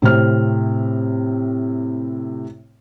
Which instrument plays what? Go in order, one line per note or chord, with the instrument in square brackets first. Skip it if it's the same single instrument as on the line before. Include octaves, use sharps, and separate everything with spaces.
[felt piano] A2 C3 C4 F6